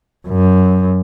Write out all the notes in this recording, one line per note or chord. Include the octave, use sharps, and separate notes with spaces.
F#2